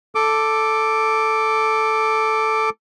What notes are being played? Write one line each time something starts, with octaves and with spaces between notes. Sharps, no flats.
A4 D6